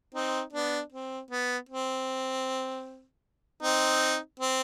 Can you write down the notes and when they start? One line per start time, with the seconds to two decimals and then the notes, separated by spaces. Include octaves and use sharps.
0.15 C4 D#4
0.53 B3 D4
0.92 C4
1.31 B3
1.69 C4
3.63 C4 D#4
4.40 C4